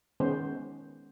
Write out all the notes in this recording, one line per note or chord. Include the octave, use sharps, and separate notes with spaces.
D#3 G#3 B3 C#4 C5